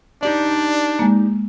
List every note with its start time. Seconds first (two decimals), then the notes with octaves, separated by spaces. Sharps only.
0.23 D4 D#4 G4 D5
0.99 G#3 A#3